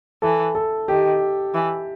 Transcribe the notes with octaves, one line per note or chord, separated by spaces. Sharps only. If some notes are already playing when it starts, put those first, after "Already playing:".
E3 A4
A4
D#3 G4
E3